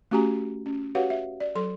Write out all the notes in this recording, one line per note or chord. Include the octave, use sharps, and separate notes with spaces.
A3 C#4 F#4 G4 G#5 A#5
C#4
F#4 G4 B4 C#5 F5 F#5
E5
D5
F#3 A4 C6